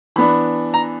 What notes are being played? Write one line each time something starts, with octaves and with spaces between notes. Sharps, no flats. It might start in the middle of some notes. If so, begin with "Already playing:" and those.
E3 B3 D4 B5
A#5